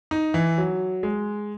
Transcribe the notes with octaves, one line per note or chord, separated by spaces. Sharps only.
D#4
E3
F#3
G#3